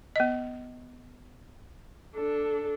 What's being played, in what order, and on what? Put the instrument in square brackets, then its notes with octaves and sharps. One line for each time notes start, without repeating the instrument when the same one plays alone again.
[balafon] B3 D#5
[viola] D4 A4